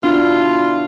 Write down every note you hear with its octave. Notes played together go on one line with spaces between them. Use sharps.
B2 D4 E4 F4